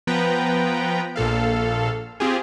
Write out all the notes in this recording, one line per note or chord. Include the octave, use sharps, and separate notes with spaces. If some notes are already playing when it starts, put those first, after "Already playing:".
F3 B3 B4 G5 A#5
A#1 A#2 A4 F5
C4 F4 G4 G#4